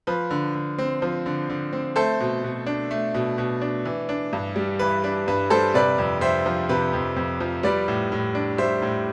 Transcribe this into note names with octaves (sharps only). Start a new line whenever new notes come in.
F3 B4
D3
D3
C4
F3
D3
D3
C4
A3 A4 C5
B2
B2
D4
A3
B2
B2
D4
E3
D4
G2
G3
E3 B4
D4 B4
G2 B4
G3 A4 C5
C3 B4 D5
F2
F2 C5 E5
F3
C3 B4
F2
F2
F3
G3 B4 D5
A2
A2
D4
G3 C5 E5
A2